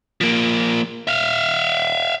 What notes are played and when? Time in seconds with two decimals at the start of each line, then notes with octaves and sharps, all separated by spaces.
0.21 F3 A#3
1.07 E5 F5